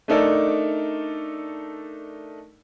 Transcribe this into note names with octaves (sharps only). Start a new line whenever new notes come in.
A3 D4 D#4 A4 A#4 D5